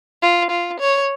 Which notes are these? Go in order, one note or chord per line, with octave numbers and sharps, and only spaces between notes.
F4
F4
C#5